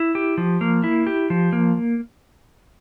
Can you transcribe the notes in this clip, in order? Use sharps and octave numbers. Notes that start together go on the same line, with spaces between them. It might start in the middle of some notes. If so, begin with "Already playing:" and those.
Already playing: E4
G4
F3
A#3
E4
G4
F3
A#3